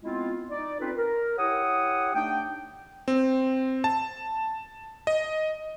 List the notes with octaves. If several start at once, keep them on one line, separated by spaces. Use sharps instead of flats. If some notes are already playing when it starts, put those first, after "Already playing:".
G#3 B3 C4 E4 F4
D#4 D5
C4 C#4 D#4 F4 A4 B4
A#4
E4 G4 C#5 F#5 D#6
A3 D4 D#4 G5
C4
A5
D#5